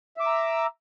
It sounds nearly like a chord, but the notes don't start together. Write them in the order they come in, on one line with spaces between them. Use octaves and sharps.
E5 D6 E6 A#5